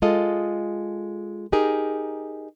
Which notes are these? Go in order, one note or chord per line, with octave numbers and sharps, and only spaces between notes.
G#3 F4 A4 D#5
D#4 G4 G#4 A#4